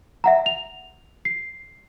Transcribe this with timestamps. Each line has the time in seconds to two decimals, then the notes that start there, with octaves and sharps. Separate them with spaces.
0.24 E5 F#5 A#5
0.46 F7
1.25 C7